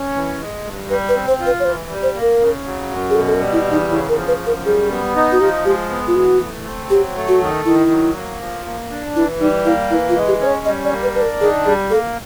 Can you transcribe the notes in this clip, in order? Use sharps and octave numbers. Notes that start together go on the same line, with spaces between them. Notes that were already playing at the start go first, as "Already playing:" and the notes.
Already playing: C#4
E3
G#3
G2
G3 B4
B4
C4
C5
F4
B4
C#5
E3 C5
G3
C5
A#3
A#4
C#3
F#3
F#2
G#4
B2 A4
A4
A#4
G3
E4
E2
D#4
C#3 E4
A#4
F3
B4
F#2
A#4
G3 G#4
B3
D#4
F#4
F3 G4
G#3 G4
B3
F4
E3 F#4
A3
C4
F#3 G4
A3
F#4
D#3
D#3 E4
F#3
A#3
F3
A#3
D4
E3 E4
G3 D#4
A#3 E4
E3 E4
F4
G#3
G4
C#4 C5
C#5
G3 D#5
D5
A#3
B4
D4 B4
A#4
D#3 G#4
G3 G#4
A#3 A4